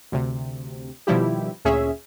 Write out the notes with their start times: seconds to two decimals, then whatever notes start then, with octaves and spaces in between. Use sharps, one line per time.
0.12 D2 C3
1.07 B2 D#3 F3 G3 E4 G4
1.65 D2 A#2 C#4 G#4 E5